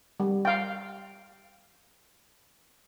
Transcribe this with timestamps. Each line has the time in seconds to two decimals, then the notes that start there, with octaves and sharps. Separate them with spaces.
0.20 G3
0.45 F5 G5